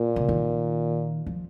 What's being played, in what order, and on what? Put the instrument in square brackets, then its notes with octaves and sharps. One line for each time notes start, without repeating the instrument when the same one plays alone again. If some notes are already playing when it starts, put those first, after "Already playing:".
Already playing: [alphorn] A#2
[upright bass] C#3
D#3
F3